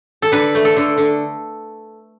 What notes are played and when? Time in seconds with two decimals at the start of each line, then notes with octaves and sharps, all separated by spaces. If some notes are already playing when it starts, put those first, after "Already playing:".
0.22 A4
0.32 D3 B4
0.55 A3
0.65 A4
0.77 D3
0.98 D3